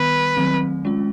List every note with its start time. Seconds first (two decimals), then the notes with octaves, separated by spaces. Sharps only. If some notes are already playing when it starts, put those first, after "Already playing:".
Already playing: D#3 G3 B3 B4
0.37 D#3 F#3 A3 C4
0.85 G#3 C#4 F4